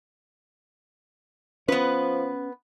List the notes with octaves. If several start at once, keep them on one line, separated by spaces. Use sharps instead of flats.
F3 B3 C#4 B4